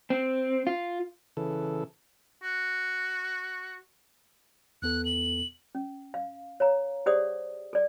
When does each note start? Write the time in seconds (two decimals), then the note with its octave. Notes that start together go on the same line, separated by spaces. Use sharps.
0.10 C4
0.67 F4
1.37 C#3 E3 A4
2.43 F#4
4.82 E2 B3 A4 F#6
5.05 F#7
5.75 C#4
6.14 F5
6.60 C#5 F5 A#5
7.06 G4 G#4 C5 D5 F#5 D#6
7.73 A4 D5